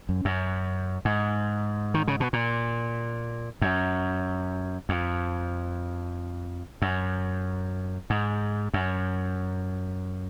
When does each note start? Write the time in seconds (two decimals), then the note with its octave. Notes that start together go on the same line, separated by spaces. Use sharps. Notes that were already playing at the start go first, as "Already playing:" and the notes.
0.09 F#2
0.25 F#2
1.05 G#2
1.94 D#3
2.08 C#3
2.20 B2
2.33 A#2
3.62 F#2
4.89 F2
6.82 F#2
8.10 G#2
8.74 F#2